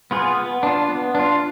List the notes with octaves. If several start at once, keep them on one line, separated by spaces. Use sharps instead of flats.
B3 F4 G#4 B4
B3
D4 F4
B3
D4 F4